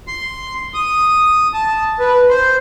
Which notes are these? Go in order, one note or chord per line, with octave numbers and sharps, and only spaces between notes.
C6
D#6
A5
B4
C5